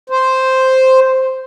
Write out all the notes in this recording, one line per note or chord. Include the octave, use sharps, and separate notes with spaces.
C5